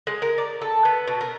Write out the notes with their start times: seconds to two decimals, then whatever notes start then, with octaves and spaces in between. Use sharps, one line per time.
0.07 G#3
0.22 A#4
0.38 D5
0.61 A4
0.85 B3
1.07 B2
1.21 A#4